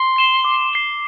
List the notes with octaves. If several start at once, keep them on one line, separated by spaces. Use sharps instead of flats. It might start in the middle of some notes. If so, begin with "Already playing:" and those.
Already playing: C6
C7 E7 G7
D6
C7 E7 G7